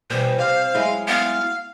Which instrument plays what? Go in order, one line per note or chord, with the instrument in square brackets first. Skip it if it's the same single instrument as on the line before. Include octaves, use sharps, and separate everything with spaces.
[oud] B2 E3 G3 [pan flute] C5
[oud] C3 [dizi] F5
[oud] F#3 G#3 E4
[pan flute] B3 [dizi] F5